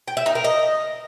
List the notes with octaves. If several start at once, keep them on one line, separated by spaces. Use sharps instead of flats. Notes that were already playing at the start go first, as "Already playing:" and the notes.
G5
E5
D#4
A#4
D#5